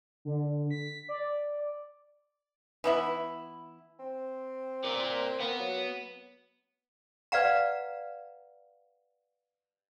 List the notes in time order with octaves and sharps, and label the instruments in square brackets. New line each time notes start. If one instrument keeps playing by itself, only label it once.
[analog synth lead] D3
B6
D5
[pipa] E3 B3 E4
[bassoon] C4
[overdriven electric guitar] A#4 D5
[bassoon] A#3 [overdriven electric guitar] B3
[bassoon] F#3
[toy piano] B4 D5 F5 F#5 A#5